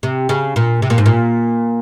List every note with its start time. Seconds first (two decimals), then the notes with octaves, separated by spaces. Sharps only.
0.03 C3
0.29 C#3
0.56 A#2
0.82 C3
0.90 A#2
0.98 G#2
1.06 A#2